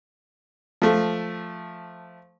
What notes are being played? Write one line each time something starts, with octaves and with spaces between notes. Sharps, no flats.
F3 A3